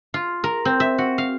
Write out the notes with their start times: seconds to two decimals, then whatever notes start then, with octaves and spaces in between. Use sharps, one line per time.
0.14 F4
0.44 A#4
0.65 C4
0.80 E5
0.98 F#4
1.18 F5